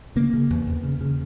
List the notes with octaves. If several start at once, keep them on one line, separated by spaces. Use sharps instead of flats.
C#3 A#3
C#3
E2
E2
C#3
C#3